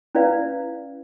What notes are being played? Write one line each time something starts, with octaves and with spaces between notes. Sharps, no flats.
C#4 E4 B4 D5 F5